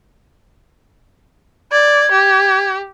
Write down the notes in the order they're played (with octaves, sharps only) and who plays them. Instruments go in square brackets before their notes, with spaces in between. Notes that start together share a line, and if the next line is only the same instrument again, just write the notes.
[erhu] D5 [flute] G#6
[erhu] G4